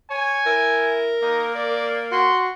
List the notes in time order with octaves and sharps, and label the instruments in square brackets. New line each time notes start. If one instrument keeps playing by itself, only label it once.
[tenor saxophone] C#5 [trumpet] G#5
[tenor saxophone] E4 [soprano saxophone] A#4
[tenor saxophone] A#3 [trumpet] D#4
[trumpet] D5
[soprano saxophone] F#4 [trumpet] C6